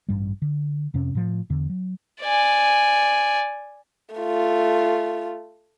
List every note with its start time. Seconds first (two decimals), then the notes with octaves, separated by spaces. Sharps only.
0.09 A1 G2 G3
0.42 D3
0.94 F2 C3 C#4
1.15 A2 F3
1.50 E2 D3
1.69 F#3
2.22 D5 G#5
4.15 A3 F4